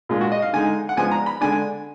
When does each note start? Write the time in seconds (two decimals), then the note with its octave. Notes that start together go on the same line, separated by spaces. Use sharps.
0.09 A#2 G#3 D4 F4
0.21 F#4
0.32 D#5
0.42 F5
0.53 D3 G#3 D#4 G#5
0.89 F#5
0.97 F3 G#3 B3 D4 G#5
1.11 A#5
1.26 B5
1.41 D3 G#3 D4 G#5